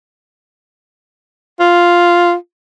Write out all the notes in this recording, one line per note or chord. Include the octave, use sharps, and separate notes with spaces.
F4